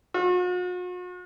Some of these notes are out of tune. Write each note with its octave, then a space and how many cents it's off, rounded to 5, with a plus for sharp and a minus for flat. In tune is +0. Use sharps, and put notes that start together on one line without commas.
F#4 -45